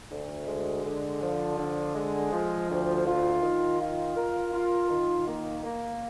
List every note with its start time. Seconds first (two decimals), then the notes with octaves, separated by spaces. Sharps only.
0.11 D2
0.47 G#3
0.85 D3
1.22 F3
1.58 D3
1.95 G#3
2.32 F3
2.69 D2
3.07 F4
3.42 D#3
3.81 F4
4.16 A#4
4.54 F4
4.90 D#3
5.28 A#3
5.64 A#3